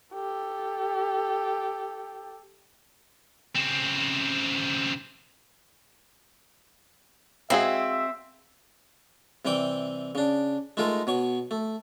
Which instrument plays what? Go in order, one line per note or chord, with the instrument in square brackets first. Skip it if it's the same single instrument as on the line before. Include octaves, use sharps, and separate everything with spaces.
[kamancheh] G4 A4
[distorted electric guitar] C#3 C4
[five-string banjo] G#3 F#4 G#4 [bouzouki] C4 [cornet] E5 [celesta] F5
[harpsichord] C3 E3 G3 G5 D6
C#3 D4
G#3 A3 D#4 F4 A#4
B2 C#5 C#6
A3